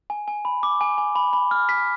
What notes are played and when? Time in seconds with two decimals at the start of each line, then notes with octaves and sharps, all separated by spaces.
0.10 G#5
0.28 G#5
0.45 B5
0.63 D6
0.81 G#5
0.98 G#5
1.16 B5
1.33 B5
1.51 F6
1.69 B6